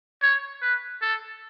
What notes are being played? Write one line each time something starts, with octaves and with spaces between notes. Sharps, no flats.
C#5
B4
A4